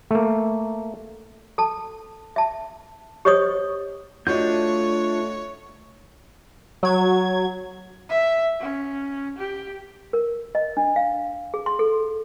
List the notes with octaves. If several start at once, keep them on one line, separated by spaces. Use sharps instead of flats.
A3 A#3
A4 A5
E5 A5
G4 C5 C#5 D#5 C#6 D#6
A3 D4 F4 F#4 C#5 D#5 G6
F#3 G#6
E5
C#4
G4
A#4
D#5
D4
F5
G#4
C6
A4